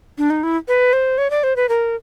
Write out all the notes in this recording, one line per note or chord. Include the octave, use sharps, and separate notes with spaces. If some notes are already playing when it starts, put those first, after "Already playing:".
D4
D#4
E4
B4
C5
C#5
D5
C5
B4
A#4